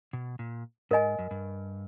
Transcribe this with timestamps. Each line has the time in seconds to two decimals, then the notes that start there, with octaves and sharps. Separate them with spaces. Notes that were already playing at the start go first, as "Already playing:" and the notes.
0.13 B2
0.39 A#2
0.91 G#2 A#4 D#5 G#5
1.19 F#2
1.31 G2